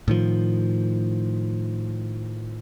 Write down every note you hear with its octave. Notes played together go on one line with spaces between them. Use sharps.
A2 D#3 F3